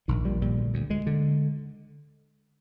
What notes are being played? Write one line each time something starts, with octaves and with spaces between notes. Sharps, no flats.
A#1 D#3
A#2 G3
A#2 G3
D2
D2
D2 G#3
D3